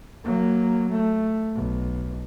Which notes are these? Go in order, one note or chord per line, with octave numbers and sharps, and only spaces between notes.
F#3 A#3
A3
B1